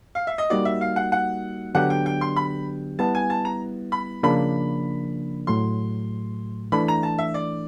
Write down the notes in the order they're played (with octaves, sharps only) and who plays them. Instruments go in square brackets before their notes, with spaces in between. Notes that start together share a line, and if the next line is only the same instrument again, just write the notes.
[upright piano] F5
E5
D#5
[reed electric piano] G3 A#3 D#4 F#4 [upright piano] D5
[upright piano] E5
F5
F#5
F#5
[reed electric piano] D3 F#3 B3 D4 G4 [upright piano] F#5
[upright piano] G5
G5
C6
B5
[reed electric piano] G3 B3 E4 [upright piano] A5
[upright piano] G#5
A5
A#5
B5
[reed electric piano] C#3 F3 A#3 D4 [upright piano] B5
[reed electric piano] A2 F#3 A3 [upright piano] C6
[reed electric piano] E3 A3 D4 [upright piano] B5
[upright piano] A#5
A5
E5
D5